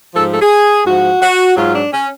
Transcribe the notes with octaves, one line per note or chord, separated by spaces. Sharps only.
G#2 F3 A4
A4
G#4
G#2 F3 F#4
F#4
G#2 F#3 F4
D4
C#4